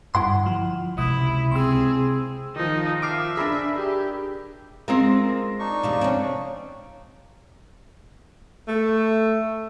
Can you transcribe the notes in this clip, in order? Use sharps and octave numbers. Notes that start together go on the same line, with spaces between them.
G2 D3 E4 F#5 C6
F3
C#2 C3 G#3 E4 D#6
C3 C4 G#4 C6 E6
D#3 F3 D#4
E5 D6 F6 C7
D4 G#4 A#4 B5
G4
G#3 C4 F4 A#4
D4 D#4 C#6
D2 C3 F3
C4 C#4
A3